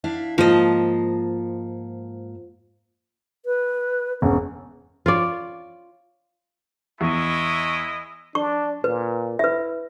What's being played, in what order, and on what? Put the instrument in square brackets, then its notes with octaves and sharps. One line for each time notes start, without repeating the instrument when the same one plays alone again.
[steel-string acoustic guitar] D4 E4 F5
[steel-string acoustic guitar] G#2 A#3 A5 [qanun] F3 D#5
[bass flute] B4
[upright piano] E1 [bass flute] C#4
[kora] F4 C#5 D5
[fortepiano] E2 [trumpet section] G#3 E4 D#5 [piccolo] C#6
[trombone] D4 [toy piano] C#6
[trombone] A#2 [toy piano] B4
[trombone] E4 [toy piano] B4 E5